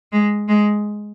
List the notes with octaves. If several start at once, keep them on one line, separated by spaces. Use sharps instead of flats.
G#3
G#3